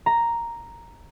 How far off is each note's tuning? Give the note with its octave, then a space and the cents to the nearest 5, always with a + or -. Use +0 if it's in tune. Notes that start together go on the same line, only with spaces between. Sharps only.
A#5 +0